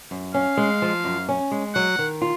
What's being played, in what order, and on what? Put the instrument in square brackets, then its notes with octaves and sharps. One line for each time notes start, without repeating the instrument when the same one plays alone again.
[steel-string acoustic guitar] F#2
[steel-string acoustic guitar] C#4 [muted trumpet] F5
[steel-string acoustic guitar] G#3
F3
F#2
C#4
G#3
[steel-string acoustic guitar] F#3 [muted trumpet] F#5
[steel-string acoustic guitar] D#3
F4